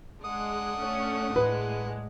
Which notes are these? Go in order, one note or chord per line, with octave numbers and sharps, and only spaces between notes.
G#3 D4 F#5 D#6
A3 C#4
A2 G#3 B4